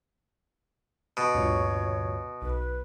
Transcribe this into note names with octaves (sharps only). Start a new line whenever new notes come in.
B2
D2 G2 A#2 C#5
B1 B4